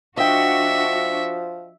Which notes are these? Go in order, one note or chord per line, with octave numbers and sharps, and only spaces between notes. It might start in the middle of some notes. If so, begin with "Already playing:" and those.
F3 D4 F#4 D#5 E5 G5